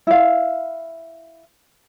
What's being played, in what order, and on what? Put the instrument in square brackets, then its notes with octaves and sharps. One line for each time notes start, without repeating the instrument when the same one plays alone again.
[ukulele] E4 F5